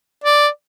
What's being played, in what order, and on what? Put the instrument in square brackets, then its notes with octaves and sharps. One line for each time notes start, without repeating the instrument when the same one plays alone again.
[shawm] D5